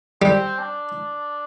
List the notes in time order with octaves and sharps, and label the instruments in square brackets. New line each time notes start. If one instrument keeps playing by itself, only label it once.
[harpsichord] G3 [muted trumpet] C4
[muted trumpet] D4